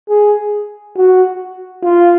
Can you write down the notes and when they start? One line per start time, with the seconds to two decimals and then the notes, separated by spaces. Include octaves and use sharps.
0.09 G#4
0.96 F#4
1.83 F4